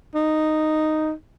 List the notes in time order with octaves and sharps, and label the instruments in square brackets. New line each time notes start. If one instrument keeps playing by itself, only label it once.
[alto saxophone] D#4